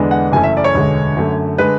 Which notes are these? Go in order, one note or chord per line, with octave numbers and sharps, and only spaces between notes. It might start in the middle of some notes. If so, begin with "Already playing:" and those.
Already playing: E2 D3 G#3 B3 D4
F#5
F#1 F#2 E3 A3 C#4 G#5
E5
D5
C#5
E1 D2 D3 G#3
F#2 D3 A3
D3 G#3 B4